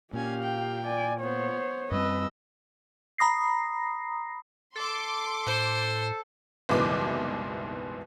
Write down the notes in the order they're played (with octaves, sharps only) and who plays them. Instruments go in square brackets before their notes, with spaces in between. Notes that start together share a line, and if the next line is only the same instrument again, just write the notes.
[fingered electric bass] A#2 [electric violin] C#4 G#5 [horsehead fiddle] G4 F5
[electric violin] G5
[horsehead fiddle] D5 G#5
[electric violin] B3 [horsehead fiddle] C5 C#5
[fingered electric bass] F#2 G3 C4 [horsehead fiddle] B4 [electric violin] D#5 E6
[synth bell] A#5 B5 D#6 A#6 C7
[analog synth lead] A4 [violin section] C6 D6
[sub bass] A2 [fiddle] C5
[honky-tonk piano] F#1 C2 G#2 B2 E3 D6